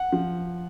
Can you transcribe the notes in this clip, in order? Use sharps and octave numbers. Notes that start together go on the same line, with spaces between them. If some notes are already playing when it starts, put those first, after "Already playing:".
Already playing: F#5
F3